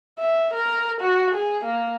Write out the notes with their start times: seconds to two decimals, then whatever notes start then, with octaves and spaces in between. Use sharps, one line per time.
0.19 E5
0.53 A#4
1.01 F#4
1.35 G#4
1.65 A#3